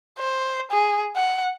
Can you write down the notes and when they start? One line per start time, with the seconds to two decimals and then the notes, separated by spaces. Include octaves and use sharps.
0.19 C5
0.71 G#4
1.16 F#5